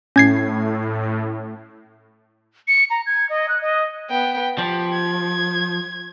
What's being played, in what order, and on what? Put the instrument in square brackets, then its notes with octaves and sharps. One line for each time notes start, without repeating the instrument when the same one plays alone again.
[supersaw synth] A2 [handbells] C#4 G#6 C7
[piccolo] C#7
A#5
G#6
D#5
F#6
D#5
[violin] B3 G5
[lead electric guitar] F3 [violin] G4
[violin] G#6